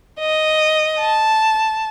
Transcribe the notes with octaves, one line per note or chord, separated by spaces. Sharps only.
D#5
A5